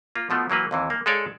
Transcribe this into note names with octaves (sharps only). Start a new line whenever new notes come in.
A#3 F4
B2 F3 A3 B3
E3 F#3 A#3 B4
D#2 C3 E3
A#3
G#3 G#4 A4 C#5 D5 F5